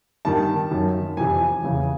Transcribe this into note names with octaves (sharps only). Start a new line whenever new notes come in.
G2 D#3 A5
F#2 D#3
F2 C3 E3 G#5
E2 C#3 E3